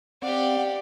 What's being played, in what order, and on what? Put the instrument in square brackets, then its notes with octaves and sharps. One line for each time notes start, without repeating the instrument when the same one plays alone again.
[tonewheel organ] C4 [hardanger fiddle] G4 F5 [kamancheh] D5 [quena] F#5